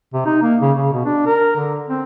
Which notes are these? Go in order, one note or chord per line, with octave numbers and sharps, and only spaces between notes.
C3
D#4
A#3
C#3
C#3
B2
D4
A#4
D3
C4